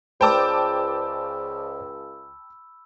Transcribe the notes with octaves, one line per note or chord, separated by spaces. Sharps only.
C#2 C5 D5 G5 A5 B5 D6 E6